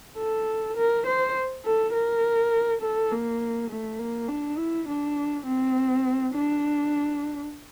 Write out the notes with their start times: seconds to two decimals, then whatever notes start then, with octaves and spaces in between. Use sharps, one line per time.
0.18 A4
0.77 A#4
1.07 C5
1.66 A4
1.94 A#4
2.82 A4
3.12 A#3
3.70 A3
3.99 A#3
4.29 D4
4.58 E4
4.88 D4
5.46 C4
6.35 D4